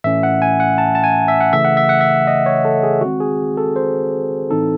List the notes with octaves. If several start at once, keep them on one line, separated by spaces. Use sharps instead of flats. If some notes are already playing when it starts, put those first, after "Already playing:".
A2 E3 A3 C#4 E5
F#5
G#5
F#5
A5
A5
G#5
E5
F#5
C#3 E3 A3 E5
F#5
E5
F#5
E5
D#5
C#5
A4
G#4
D#3 G#3 C4 F#4
G#4
A4
C5
A2 E3 C4 D#4 A4